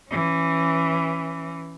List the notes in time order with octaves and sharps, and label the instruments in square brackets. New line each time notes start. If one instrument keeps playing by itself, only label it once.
[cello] E3 C#4